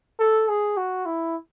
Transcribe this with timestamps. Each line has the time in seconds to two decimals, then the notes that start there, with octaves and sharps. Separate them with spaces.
0.20 A4
0.49 G#4
0.77 F#4
1.06 E4